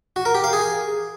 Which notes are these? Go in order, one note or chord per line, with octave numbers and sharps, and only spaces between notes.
F#4
A#4
G4
F5
G#4